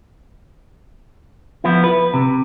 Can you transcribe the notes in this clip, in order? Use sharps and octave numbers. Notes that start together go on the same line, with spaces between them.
F3 B3 E4
B4
C3